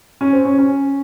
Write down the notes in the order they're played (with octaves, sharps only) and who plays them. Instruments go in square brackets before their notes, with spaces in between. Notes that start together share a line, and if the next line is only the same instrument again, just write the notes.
[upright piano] C#4
C4
C#4
C#4